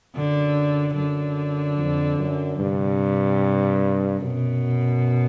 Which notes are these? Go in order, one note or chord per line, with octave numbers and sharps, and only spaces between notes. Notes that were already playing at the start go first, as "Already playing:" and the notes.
F#2 D3
F#2 D3
F2
F#2
G2 C3
F#2 B2